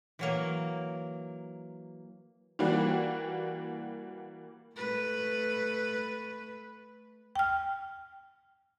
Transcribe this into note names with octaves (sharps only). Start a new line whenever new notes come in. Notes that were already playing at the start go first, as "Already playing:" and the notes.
E3 F#3 A#3
E3 G3 A#3 F#4
A3 B4
G5 F6